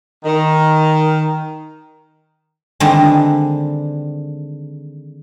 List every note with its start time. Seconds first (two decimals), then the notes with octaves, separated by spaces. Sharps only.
0.25 D#3
2.80 D3 D#3 G3 G#3 C4 D4